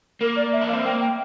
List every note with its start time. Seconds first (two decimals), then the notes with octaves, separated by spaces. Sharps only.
0.21 A#3 A#4
0.36 D5
0.53 E5
0.61 D4
0.69 F5
0.73 C4
0.85 A#3 G5
1.01 G5